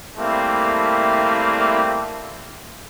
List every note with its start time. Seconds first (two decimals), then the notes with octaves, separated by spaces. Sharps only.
0.17 G3 A3 A#3 C4 E4